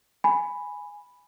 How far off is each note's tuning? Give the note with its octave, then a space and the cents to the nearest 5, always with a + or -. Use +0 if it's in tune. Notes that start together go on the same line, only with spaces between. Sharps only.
G#5 +0 B5 +0